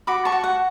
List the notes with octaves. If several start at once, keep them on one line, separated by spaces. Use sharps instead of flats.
F#4 B5 D6
A5 C#6
F#4
F#5